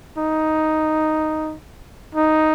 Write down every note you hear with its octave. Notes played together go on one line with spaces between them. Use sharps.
D#4
D#4